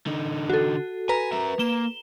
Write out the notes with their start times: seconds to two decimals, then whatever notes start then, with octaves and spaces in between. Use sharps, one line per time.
0.07 D3 D#4
0.50 F#4 A4
1.09 B4 G#5 A#5
1.32 A#4 E5
1.59 A#3 E7 G7